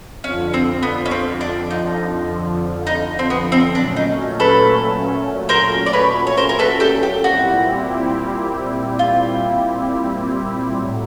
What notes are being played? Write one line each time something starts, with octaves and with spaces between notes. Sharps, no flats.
F2 D3 F3 C#4
C4
B3
C#4
C4
D4
D#4
D#4
C4
B3
C4
A#2 F#3 A3 C#4 D4
D#4
A4 B4
A#4 C5
D5
B4 C#5
C#5
A#4 C5
A#4
A4 B4
G4 A4
G4
A#2 G3 C4 E4 F#4 G4
F4
A2 F#3